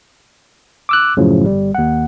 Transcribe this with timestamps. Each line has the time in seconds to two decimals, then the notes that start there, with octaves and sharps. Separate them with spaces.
0.89 D6 E6 F#6
1.17 F#2 A2 C#3 F3 F#3
1.46 G1 G3
1.75 D#2 F#5